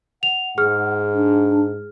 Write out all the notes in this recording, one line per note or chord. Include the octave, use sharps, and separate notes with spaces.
F#5 F7
G#2 G#4 F6
D4